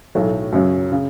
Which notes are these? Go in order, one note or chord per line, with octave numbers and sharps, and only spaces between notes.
B1 A2 F#3 A3
F#2 C#3 F#3
C#3